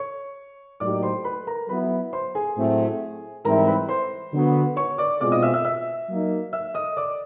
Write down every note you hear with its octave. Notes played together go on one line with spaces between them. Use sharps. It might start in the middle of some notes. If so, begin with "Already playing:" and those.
Already playing: C#5 C#6
A2 F#3 A#3 D#4 G4 D5 D6
C5 C6
B4 B5
A#4 A#5
F#3 B3 E4 B4 B5
C5 C6
G#4 G#5
A2 F#3 A3 C4
G#2 E3 G3 C4 E4 A#4 A#5
B4 B5
C5 C6
D3 F#3 B3
C#5 C#6
D5 D6
B2 G#3 C4 F4 D5 D6
D#5 D#6
E5 E6
E5 E6
E5 E6
F#3 A#3 D#4
E5 E6
D#5 D#6
D5 D6